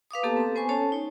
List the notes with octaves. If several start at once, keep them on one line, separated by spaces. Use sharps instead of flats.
B4 F5 D6 D#6
A#3 B3 G4 A4 A5
C4 A4
B3 C5 G#5 C#6
C#4 A4 C#5 A5
D#4 C#5